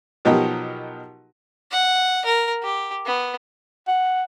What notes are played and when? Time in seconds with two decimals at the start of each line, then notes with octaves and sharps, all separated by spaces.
0.25 B2 F3 F#3 D#4 G4 A#4
1.71 F#5
2.25 A#4
2.63 G4
3.06 B3
3.88 F#5